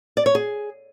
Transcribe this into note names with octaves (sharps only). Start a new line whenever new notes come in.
D5
C#5
G#4